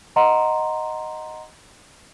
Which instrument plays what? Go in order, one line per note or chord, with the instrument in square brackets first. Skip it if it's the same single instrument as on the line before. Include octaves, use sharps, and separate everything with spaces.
[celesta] D#5 F#5 A#5 C6